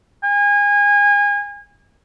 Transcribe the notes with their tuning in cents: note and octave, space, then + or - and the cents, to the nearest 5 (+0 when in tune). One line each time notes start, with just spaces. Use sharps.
G#5 -30